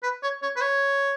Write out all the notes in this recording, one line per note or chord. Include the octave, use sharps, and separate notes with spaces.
B4
C#5
C#5
B4
C#5